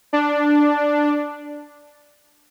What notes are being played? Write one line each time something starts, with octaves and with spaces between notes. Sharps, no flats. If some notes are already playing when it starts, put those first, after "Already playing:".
D4